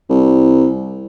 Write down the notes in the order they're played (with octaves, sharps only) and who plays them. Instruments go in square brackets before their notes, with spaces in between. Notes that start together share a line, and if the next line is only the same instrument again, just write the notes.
[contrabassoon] C2